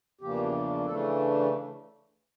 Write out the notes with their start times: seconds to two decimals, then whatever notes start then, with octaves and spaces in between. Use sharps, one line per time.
0.21 E2 C#3 F3 A#3 D4 G4
0.86 C#3 E3 A3 D4 A4